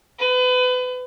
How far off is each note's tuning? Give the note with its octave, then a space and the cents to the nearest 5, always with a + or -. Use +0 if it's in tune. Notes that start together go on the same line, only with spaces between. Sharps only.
B4 +30